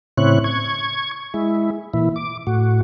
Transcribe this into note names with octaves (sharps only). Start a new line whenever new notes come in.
A2 C#3 C4 E4 C#5 F#6
C#6 G#6
G#3 E4
A#2 E3 E4
D6
A2 F#4